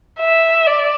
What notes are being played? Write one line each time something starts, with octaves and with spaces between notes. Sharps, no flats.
E5
D5